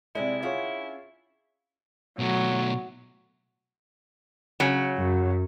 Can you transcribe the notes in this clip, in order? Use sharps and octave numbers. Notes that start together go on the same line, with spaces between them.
C3 G#3 E4 D5 D#5
C#4 D4 F4 G#4 C#5 F#5
B2 F#3 A3
C#3 F#3
F#2